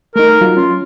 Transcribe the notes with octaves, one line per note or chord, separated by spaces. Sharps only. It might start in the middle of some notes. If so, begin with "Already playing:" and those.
A3 D#4 A#4
F#3 F4
C#4 F4